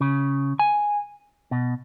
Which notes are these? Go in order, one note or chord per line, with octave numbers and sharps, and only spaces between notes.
C#3
G#5
B2